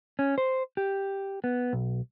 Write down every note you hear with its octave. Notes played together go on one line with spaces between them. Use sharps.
C#4
C5
G4
B3
B1